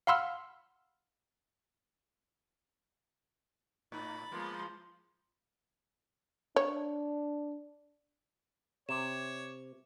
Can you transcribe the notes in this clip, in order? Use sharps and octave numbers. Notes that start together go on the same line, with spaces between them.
F5 F#5 B5 C6 E6 F6
A2 D#4 B5 A6
F3 G#3 A#3 B3 C6
D4 C#5
C3 C#5 D6 E7